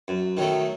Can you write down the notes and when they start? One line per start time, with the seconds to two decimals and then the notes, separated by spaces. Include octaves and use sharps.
0.08 F#2
0.37 D#3 F#3 A3